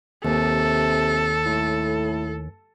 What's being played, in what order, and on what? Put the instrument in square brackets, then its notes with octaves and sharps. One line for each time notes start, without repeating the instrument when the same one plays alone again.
[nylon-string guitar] D#2 [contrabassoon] C3 [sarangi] A4
[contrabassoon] A2